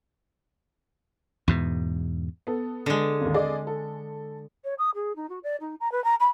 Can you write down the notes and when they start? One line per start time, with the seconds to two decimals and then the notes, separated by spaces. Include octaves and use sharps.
1.48 E2 G#2 B2
2.47 B3 A4
2.86 D3 G#3
3.21 G#1 D#2
3.34 G#4 D5 D#5
3.67 A4
4.64 C#5
4.78 D#6
4.95 G#4
5.16 D#4
5.29 F#4
5.43 D5
5.60 D#4
5.80 A#5
5.91 B4
6.04 A#5
6.20 B5